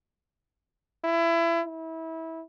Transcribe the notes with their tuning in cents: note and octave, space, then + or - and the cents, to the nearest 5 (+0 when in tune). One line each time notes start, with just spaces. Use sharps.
E4 +25
E4 -25